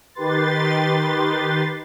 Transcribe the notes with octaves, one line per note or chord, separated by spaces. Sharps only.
D#3 G4 B4 C6 A6